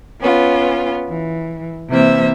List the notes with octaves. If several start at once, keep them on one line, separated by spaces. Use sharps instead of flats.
B3 C#4 F4
E3
C3 E3 A#3 C5 E5